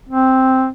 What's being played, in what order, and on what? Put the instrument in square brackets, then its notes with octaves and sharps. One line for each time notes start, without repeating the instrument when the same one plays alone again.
[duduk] C4